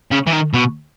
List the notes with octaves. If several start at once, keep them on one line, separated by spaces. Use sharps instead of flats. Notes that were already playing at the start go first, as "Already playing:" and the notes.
C#3
E3
D#3
B2